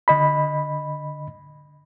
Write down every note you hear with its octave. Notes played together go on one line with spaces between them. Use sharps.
D3 D#5 B5